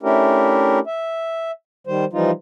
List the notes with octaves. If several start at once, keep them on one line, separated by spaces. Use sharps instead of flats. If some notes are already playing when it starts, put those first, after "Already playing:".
A3 C#4 D4 E4 G4 A#4
E5
D#3 G3 C5
E3 F3 G3 D#4 F4